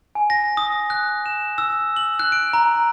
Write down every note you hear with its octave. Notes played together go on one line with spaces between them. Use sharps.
G#5
A#6
D#6
F#6
E7
E6
F#7
F#6
D7
A#5